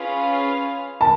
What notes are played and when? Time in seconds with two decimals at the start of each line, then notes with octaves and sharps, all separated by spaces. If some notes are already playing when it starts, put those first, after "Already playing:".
Already playing: C#4 F4 G#4 B4 F5
1.01 A5